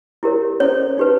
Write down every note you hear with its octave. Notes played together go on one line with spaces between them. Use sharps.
E4 G4 A#4 C#5
C#4 E4 A4 C5 C#5
D#4 G4 B4